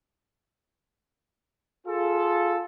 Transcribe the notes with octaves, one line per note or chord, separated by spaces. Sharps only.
F4 G#4 A4